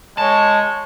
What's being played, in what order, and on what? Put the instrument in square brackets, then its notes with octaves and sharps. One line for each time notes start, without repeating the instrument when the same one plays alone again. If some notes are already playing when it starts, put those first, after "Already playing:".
[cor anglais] G#3 [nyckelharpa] C#5 [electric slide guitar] A5